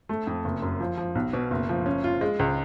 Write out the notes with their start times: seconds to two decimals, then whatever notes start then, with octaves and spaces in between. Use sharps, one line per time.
0.09 A3
0.27 F2
0.45 F#1
0.62 F#2
0.80 F3
0.98 F3
1.15 B1
1.33 B2
1.51 F#1
1.69 F3
1.86 C#4
2.04 F4
2.21 G#3
2.39 C#2